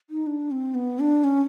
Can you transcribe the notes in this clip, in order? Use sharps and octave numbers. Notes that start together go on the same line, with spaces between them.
D#4
D4
C4
B3
D4
C#4